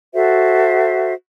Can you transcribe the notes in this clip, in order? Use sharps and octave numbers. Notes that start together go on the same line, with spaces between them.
F#4 A4 C5 E5